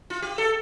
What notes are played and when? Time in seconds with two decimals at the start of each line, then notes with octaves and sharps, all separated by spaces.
0.10 F4
0.22 G4
0.38 A4